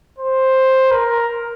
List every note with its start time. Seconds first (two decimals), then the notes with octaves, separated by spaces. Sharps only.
0.18 C5
0.91 A#4